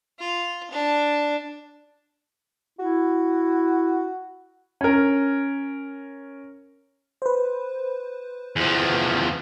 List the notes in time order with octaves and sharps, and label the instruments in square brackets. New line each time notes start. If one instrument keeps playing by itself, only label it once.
[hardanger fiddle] F4
D4
[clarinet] E4 [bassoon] F#4
[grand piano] C#4 A#4
[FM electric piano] B4 C5
[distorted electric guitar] E2 F3